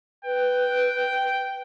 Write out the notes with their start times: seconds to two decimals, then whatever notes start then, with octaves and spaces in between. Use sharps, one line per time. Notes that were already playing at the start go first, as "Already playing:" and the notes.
0.25 B4 G5